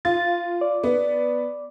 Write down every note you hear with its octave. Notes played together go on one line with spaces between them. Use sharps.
F4 A6
D5
B3